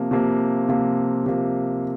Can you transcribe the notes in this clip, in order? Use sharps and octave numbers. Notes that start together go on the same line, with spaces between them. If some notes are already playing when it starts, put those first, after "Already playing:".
Already playing: C3 F3 A#3
C3 F3 A#3
C3 F3 A#3
C3 F3 A#3